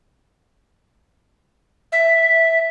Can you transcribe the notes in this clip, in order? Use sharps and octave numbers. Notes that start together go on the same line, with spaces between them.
E5